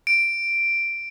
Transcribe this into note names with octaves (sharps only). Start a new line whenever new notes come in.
D7